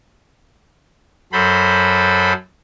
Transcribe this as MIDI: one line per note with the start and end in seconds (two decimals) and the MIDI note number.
1.32 2.33 42
1.32 2.33 54
1.32 2.33 69
1.32 2.33 72
1.32 2.33 83